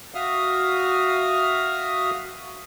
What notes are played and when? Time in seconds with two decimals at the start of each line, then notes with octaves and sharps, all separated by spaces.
0.14 F#4 E5 F5 D#6 F6